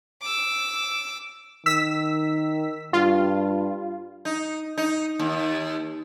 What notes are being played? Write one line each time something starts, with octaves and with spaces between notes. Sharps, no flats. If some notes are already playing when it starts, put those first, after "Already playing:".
D6 E6
D#3 E6 B6
G2 F4
D#4
D#4
D#2